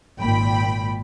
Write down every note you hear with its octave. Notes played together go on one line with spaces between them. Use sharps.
G#1 A#2 G5 B5